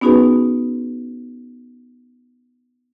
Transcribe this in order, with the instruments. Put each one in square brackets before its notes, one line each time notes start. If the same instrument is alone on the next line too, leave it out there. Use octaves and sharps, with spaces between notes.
[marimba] B3 C#4 D#4 F#4 G#4 B4